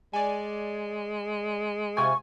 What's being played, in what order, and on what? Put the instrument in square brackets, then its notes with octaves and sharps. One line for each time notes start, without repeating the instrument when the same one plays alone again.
[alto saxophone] G#3 [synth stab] D5 G#5
[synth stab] C3 F4 G#5 [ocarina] C#6